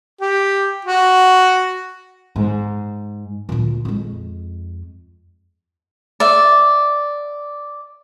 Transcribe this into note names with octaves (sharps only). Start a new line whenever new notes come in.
G4
F#4
G#2
D2 A#2
F2 G#3
D5 E5